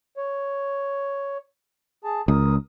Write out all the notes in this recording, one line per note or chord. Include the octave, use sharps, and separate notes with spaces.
C#5
G#4 A5
C#2 A#4 D#6